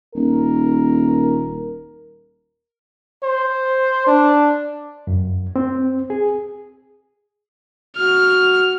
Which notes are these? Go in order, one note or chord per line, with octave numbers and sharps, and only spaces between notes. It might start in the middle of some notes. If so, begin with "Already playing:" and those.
D#1 A#4
C5
D4
F#2
C4
G#4
F#4 F6